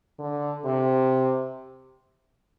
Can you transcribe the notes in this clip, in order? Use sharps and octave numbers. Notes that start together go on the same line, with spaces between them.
D3
C3